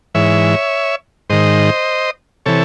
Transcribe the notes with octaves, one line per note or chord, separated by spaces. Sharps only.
G#2 E3 C#5 E5
G#2 D#3 C5 D#5
C3 E3 A4 C#5